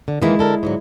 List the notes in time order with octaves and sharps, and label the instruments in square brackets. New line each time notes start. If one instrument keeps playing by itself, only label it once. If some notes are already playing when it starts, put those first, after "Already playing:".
[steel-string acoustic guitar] D3
[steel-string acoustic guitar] D#3 E3 A#3 [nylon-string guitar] G#3 E4
[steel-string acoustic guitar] D3 A4 A#4
G#2 D3 F#3